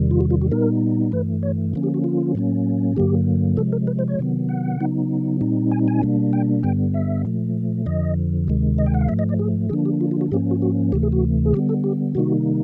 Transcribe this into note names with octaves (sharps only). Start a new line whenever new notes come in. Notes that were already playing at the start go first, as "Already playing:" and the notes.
Already playing: E2 C3 D#3 G3
F4
F#4
F4
F#4
A#2 G3 B3 D#4 A#4
G2 E3 A3 B4
C#5
D3 F3 A#3 C#4
G4
F#4
F4
A2 F#3 A#3 C#4
G2 D3 F#3 A#3 G4
C3 F3 G#3 A4
A#4
B4
C5
C#5
C3 D#3 F#3 B3
F#5
C#3 F#3 B3 D#4
A#2 G3 C4 D#4
G#5
G#5
B2 G3 A#3 D4
G5
G2 D3 G3 B3 G5
E5
A#2 F3 A3
F2 D3 F3 D#5
D2 C3 D#3 G#3
D#5
G5
F#5
F5
G#2 F3 A3 E5
D#5
D5
G#4
D3 F3 A#3 D4 G#4
G4
F4
F4
F#4
G#2 F3 A#3 C#4 G4
F#4
F#4
D2 C3 E3 A3 G4
G#4
F#4
G#4
D3 G3 B3 G4
A4
G4
C3 D#3 G3 A#3 D#4 F#4